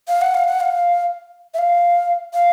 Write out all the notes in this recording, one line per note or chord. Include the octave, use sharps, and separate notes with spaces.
F5
F#5
F5
F#5
F5
E5
F5
F5